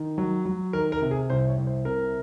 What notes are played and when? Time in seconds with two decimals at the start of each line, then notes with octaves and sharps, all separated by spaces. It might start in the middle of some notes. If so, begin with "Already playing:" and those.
Already playing: D#3
0.18 F#3
0.45 F#3
0.73 D#3 A#4
0.92 A#4
1.02 C3
1.11 G#4
1.30 C2 C5
1.48 C#5
1.58 C2
1.67 C5
1.85 C3 A#4